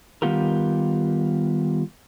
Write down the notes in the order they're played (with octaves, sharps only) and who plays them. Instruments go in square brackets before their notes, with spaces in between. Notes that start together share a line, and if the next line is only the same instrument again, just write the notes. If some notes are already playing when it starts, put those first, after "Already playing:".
[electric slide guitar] D#3 G3 B3 F4 G4 A#4